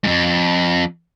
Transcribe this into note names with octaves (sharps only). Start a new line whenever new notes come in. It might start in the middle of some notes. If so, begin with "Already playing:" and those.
F2 G#2